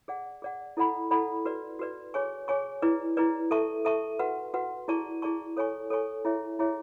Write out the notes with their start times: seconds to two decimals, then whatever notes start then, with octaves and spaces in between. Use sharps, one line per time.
0.08 G#4 D5 F#5
0.42 G#4 D5 F#5
0.77 E4 A4 D5 F#5 B5
1.11 E4 A4 D5 F#5 B5
1.45 F#4 B4 D5
1.79 F#4 B4 D5
2.14 G#4 C#5 G#5 C#6
2.48 G#4 C#5 G#5 C#6
2.82 E4 G#4 B4 D5
3.17 E4 G#4 B4 D5
3.51 A4 E5 A5 C#6
3.85 A4 E5 A5 C#6
4.19 F#4 B4 F#5
4.54 F#4 B4 F#5
4.88 E4 G#4 D5 A5 C#6
5.22 E4 G#4 D5 A5 C#6
5.57 A4 C#5 G#5 C#6
5.90 A4 C#5 G#5 C#6
6.25 E4 G#4 C#5 E5
6.59 E4 G#4 C#5 E5